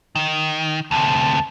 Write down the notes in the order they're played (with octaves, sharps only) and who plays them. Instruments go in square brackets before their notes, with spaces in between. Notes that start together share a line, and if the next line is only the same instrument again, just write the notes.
[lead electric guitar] D#3
[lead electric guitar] D2 C3 [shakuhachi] A5